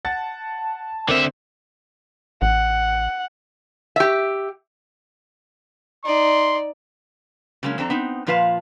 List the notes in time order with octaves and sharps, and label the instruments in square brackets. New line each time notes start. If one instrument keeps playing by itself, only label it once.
[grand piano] F#5 A6 [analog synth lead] A5
[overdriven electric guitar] D3 E5 [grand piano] C4 [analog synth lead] A#4
[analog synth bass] A1 [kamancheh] F#5
[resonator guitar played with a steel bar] G4 E5
[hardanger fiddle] D#4 D5 [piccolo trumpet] C6
[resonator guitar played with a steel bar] C#3 F#3 G#3 A#3 C#4
F2 C4 D4 A4 A#5
B3 C4 D#4
A#2 F3 F4 B4 F5 A5